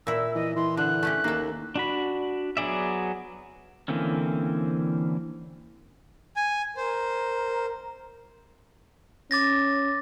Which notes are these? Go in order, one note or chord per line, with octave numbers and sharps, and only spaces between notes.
A#2 E4 E6
E3 D#5
E3 C6
D3 F#6
A3 C#4 G4
D#2 A#3 A4
D4 F#4 B5
F#3 B3 G#4 D5 E5
D3 E3 A#3 C4 C#4
G#5
A#4 C5
C#4 D6 A6 A#6